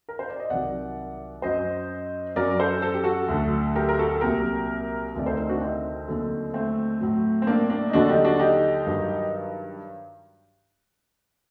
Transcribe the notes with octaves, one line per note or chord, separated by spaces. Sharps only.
A#4
C5
D5
D#5
C2 C3 D#3 F#3 D5 F#5
F#2 F#3 C5 D#5
F#2 F#3 A#4 D5
A4 C5
A4
G4
F#4 A4
D2 D3 F#3
G4 A#4
A#4
F#4 A4
C2 A#2 F#3 G4 A#4
D2 C3 D#3 D5
A4 C5
C4 D#4
D4 F#4
C4 D#4
D#2 D3 F#3
A3 C4
A2 F#3
C4
A#3 D4
A#3 D4
D#4
D#2 D3 F#3 D4 F#4
D#4 G4
D4 F#4
D#4 G4
G2 D#3 F#3